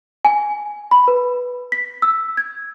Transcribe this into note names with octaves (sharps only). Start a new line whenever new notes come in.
G#5
B5
B4
B6
E6
G#6